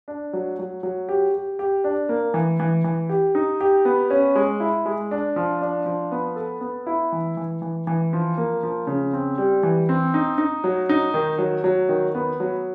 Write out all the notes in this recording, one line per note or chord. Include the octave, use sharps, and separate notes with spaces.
D4
F#3
F#3
F#3
G4
G4
G4
D4
A#3
E3
E3
E3
G4
D#4
G4
B3
C#4
G#3
E4
G#3
D4
F3
D4
F3
B3
A4
B3
E4
E3
E3
E3
E3
F3
A#3
F3
C#3
C4
G3
E3
C4
D#4
D#4
F#3
D#4
D#3
F#3
F#3
D#3
B3
F#3